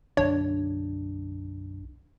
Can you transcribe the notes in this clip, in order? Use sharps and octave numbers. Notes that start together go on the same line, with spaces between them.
B1 F#2 D3 D4 C#5